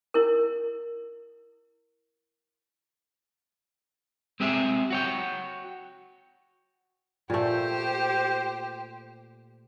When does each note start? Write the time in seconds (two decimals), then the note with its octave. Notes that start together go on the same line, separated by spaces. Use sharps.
0.14 E4 A#4
4.40 G#3 C4 G4 G#4 E5
4.91 F#4 C#5 G5
7.30 A#2 A3 G4 C5